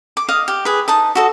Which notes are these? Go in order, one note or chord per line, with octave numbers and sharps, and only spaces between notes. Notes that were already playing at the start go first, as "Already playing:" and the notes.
D6
D#5 F5 D#6
G4
G#4 B4
D#4 A5 D#6
F#4 A4 D#5